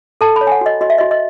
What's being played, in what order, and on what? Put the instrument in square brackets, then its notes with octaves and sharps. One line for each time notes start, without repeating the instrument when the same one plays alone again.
[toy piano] A4 A5
B5
C#5
G#5
F#5
F#4 D#5
F#4 D#5
E5
F#4 D#5
D#5